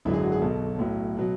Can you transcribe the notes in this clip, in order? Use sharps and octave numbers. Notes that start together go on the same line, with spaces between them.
G#1 F#2 D3 F#3 E4
G#4
F#4
G#4
B1 B2 F#3 A4
B1 A2 F#3
B2 F#3